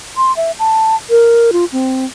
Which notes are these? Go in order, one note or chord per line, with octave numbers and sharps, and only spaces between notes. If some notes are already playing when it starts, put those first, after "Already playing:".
C6
E5
A5
A#4
F4
C4